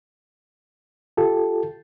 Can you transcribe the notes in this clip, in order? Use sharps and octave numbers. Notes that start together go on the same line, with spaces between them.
F4 G4 A4